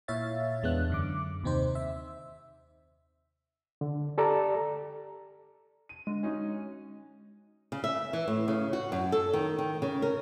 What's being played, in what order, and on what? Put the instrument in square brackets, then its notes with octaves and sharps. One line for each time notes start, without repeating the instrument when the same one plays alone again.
[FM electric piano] A#2 E4 C#5 E5 F5 A6
E2 G#3 B3 D4 F#6
F#2 D3 D6
D#2 C3 C4 D#4 C5
E5
[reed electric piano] D3
G4 A4 D5 A#5
[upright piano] D#7
[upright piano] D3 [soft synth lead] G#3
[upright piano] C#4 D#4 F#4
[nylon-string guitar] C#3
E5
E3
A2
C#3
F#4
F#2
A4
D#3
D#3
C#3
A#4